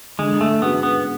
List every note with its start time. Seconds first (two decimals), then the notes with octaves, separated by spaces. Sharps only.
0.19 D3 G#3
0.41 A3
0.62 G#3 B3 C#4 F#4
0.83 B3